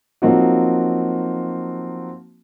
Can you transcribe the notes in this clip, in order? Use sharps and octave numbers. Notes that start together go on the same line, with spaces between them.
F3 F#3 A#3 C4 D#4 F#4